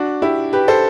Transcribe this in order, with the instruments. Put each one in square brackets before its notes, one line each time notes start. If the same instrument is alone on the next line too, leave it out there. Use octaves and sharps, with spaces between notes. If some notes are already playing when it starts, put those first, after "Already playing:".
Already playing: [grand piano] D4 F#4
E4 G4
G4 B4
A4 C5